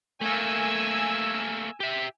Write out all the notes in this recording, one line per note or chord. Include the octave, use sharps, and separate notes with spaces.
A3 A#3 G#5 E6
G4 E5